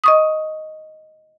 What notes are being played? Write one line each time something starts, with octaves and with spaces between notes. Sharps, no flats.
D#5 C#6 D#6